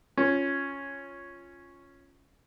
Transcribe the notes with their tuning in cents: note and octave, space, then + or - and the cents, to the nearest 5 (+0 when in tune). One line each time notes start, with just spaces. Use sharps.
C#4 +0 F4 +0